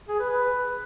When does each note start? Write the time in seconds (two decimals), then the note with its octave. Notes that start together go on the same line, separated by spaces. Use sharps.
0.09 G#4
0.19 B4
0.30 B4